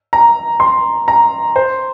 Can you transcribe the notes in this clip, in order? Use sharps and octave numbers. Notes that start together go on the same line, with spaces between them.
A#5
C6
A#5
C5